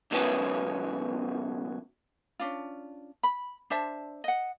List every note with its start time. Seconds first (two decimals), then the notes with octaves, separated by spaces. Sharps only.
0.11 C#2 F#2 B2 D#3 B3 C#4
2.39 C#4 D4 F4
3.23 B5
3.70 D4 C5 E5 A5
4.24 D#5 F#5